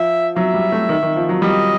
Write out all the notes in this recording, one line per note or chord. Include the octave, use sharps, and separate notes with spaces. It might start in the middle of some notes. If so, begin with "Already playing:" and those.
Already playing: F3 E5
F#3 E5
G3
A3
D#3
D#3
F3
F#3
G3 D#5